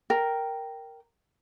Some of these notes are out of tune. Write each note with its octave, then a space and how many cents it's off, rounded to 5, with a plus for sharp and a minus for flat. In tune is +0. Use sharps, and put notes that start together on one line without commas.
A#4 +0 G5 -5